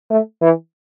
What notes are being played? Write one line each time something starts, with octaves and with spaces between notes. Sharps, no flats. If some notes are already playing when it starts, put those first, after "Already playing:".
A3
E3